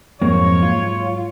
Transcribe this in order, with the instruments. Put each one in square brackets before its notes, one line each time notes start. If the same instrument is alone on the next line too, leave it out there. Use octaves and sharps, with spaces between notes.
[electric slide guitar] F2 A#3 C4 [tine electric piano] G#2 F#3 G#3 [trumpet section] C#5
[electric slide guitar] F4